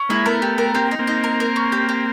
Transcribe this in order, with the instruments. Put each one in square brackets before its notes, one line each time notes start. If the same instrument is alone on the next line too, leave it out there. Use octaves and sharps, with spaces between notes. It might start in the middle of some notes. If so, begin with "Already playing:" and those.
Already playing: [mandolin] C#4
[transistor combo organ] G#3 A#3 [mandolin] E4
[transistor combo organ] A3 B3 [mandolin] A#4
[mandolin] G4
A#4
[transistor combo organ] A#3 C4 [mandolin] G4
[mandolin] D#4
[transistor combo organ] A#3 C4
[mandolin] D#4
A#4
A#4
C#4
G4
G4